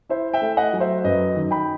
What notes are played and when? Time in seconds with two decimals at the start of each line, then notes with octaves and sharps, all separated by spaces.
0.09 E4 C5 E5
0.34 E5 G5
0.41 A3
0.57 D#5 F#5
0.73 F#3
0.80 C5 E5
1.04 F#2 B4 D#5
1.35 D#3
1.51 G5 B5